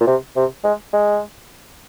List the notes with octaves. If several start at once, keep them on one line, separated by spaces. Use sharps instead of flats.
A#2
C3
C3
G#3
G#3